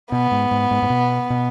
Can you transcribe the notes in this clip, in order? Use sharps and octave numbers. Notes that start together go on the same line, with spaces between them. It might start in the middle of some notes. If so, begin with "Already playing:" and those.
B2 B3
G#2
G#2
G#2
G#2
B2
B2